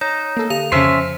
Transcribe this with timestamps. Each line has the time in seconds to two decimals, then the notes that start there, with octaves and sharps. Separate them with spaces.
0.01 D#4 C#5
0.37 A#3 A4
0.50 D3 A#5 F7
0.72 F2 C#3 C#4 C5 E5 A5 C6